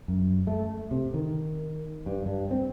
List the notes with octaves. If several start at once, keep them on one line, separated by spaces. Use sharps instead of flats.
F#2
A3
C3
D#3
G2
G2
C4